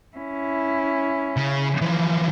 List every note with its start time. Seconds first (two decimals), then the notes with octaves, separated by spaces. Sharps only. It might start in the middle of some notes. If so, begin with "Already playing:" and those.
0.17 C#4 E4
1.37 C#3
1.81 E3 F3